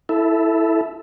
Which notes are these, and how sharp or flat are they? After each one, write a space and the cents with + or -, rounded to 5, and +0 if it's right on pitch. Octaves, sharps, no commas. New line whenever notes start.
E4 +0 A4 +0 E5 +0